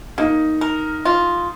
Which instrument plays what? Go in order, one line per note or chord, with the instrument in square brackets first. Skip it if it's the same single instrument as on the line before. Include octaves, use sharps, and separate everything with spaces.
[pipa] A#3 [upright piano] D#4
[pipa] A#4
F4